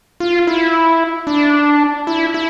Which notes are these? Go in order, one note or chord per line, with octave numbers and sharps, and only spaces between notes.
F4
E4
D4
E4
E4